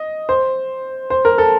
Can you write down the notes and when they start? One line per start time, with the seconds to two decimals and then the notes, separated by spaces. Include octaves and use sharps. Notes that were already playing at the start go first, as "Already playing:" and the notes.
Already playing: D#5
0.29 C5
1.10 C5
1.25 A#4
1.38 A4